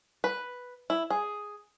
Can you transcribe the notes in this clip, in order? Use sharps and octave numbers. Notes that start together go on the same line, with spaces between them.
B4
E4
G#4